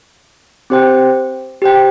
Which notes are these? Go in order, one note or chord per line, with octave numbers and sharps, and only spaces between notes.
C4 G4 C5 G5
G4 C5 G5